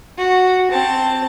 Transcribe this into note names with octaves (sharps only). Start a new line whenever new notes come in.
F#4
C4 A5